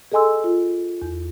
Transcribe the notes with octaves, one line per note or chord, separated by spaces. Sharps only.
G#4 A4 D#5 G#5 C6 E6
F4
E2